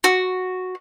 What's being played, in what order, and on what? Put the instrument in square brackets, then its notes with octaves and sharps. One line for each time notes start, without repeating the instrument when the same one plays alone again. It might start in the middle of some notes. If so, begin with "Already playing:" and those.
[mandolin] F#4